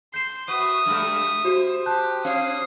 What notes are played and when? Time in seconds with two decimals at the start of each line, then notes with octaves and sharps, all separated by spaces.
0.14 C6 G6 C7 E7
0.48 F#4 B4 E5 D#6
0.86 G2 G#3
1.44 F#4 G4 C5
1.86 G4 A5 F#6 G6
2.25 C4 F5 D#6 C7